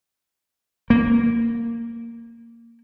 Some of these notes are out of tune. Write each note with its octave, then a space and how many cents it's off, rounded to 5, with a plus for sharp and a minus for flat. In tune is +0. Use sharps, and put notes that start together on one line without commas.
A#3 -10